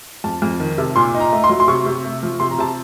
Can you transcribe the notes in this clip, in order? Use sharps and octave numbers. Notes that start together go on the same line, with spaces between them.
F2 A5
F2
D#3
C3
A#2 C6
D#4
A#5
A3
C6
F#3
C6
C3 C#6
C3
A3
F3
C3 C6
A#5
C3 A5